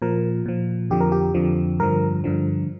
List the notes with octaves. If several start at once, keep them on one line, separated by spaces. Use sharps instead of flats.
A#2 F3 A#4
A#2 F3
F2 D3 F3 G4
A#4
G4
F2 D3 F3
G2 D3 F3 A#4
G2 D3 F3